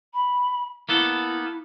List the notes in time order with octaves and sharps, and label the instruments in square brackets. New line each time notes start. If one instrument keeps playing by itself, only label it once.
[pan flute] B5
[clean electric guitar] A#3 B3 A4 [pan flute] E4